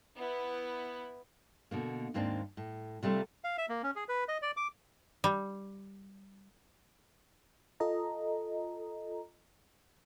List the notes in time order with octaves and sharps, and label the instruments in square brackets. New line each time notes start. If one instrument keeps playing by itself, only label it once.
[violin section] B3 E4 B4
[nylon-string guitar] B2 D3 A#3
D#2 G#2 A#3 C4 D4
A2
C3 G3 A3 B3 C4 F4
[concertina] F5
E5
A#3
C#4
G#4
B4
D#5
D5
D6
[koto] G3
[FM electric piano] F4 A4 D#5 A#5